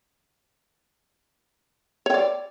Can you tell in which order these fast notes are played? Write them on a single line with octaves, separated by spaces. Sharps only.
C#5 G5 D5